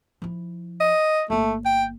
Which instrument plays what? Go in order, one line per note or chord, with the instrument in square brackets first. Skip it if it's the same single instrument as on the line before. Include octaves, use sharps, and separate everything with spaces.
[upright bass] F3 E4
[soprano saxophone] D#5
[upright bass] G1 A#3 [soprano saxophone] A3
[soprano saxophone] G5